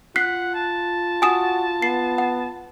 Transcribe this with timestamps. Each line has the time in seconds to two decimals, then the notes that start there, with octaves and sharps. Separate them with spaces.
0.16 F4 F#5 F#6 B6 C7
0.54 A5
1.22 F#4 G#5 D#6 E7
1.82 B3 C7
2.18 F#5